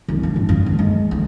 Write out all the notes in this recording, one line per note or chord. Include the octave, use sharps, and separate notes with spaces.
C2
D4
G#2
G2
D2
G#3
D2